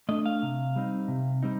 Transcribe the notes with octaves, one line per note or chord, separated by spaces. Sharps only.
A3 D4 D#5
F5
C3
G3 C4 D#4
C3
G3 C4 D#4